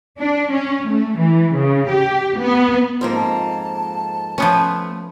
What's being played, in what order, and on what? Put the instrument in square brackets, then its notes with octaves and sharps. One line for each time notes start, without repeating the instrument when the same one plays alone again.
[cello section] D4
C#4
A3
E3
C#3
G4
B3
[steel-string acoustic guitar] F2 G#2 A#3 [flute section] C6
[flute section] A5
[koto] F3 B3 C#4 [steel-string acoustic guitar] A3 B4